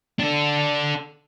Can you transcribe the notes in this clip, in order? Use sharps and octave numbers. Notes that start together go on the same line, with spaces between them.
D4 A4